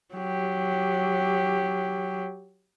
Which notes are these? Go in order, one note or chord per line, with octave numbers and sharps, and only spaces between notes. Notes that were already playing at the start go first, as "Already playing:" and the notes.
F#3 G4